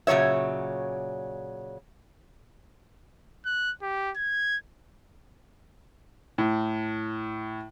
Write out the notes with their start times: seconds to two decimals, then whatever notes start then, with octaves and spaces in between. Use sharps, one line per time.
0.07 A#2 C#3 F#3 C#5 E5
3.45 F#6
3.82 G4
4.16 G#6
6.38 A2